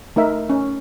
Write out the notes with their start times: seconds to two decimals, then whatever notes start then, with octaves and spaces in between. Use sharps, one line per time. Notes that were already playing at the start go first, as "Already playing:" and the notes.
0.16 A3 D#4 A#4 E5
0.50 C#4